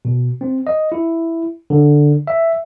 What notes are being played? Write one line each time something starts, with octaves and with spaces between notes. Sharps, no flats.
B2
C4
D#5
E4
D3
E5